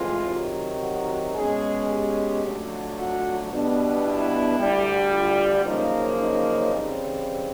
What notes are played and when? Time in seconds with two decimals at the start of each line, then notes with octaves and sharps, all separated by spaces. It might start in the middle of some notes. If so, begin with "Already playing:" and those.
Already playing: A2 E3 G#3 C4 F4
0.27 C3 D#3 F#3
0.81 F#4
1.34 B2 G#3 C#4 G#4
1.88 G4
2.42 F2 D3 F#3 A3
2.96 F#4
3.50 B2 G3 B3 D4
4.03 E4
4.58 D2 D3 G3
5.11 F4
5.65 F#2 C#3 F3 A#3 D#4
6.19 D#4
6.73 C#3 E3 G3 C4